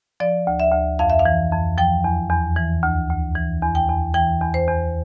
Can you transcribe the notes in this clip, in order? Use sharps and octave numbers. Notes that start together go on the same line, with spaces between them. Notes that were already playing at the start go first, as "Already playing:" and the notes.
F3 D5
D2
E5
D2
F2 F5
E5
F5
E3
F2
F3 G5
E2
E2
E3
D2
D2
E3
E2
G5
E2
E3 G5
E2
C5
E2